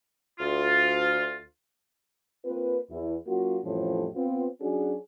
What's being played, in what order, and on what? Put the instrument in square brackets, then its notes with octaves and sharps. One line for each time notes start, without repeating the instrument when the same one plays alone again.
[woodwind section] D2 F4
[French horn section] A#3 C4 F4 B4
E2 E4
F#3 A#3 C#4 F4 F#4
F2 A2 E3 F3 G3 C#4
B3 C4 F4
F#3 C#4 D4 F#4 G#4